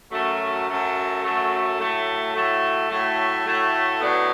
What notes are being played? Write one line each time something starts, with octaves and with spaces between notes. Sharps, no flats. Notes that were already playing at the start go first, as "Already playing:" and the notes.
F#2 F#3 A3
F#2 F#3 A3
F#2 F#3 A3
A2 F#3 A3
A2 F#3 A3
A2 F#3 A3
A2 F#3 A3
A2 F#3 B3 D4